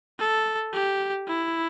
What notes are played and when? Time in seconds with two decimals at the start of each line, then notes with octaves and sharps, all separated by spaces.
0.19 A4
0.73 G4
1.28 E4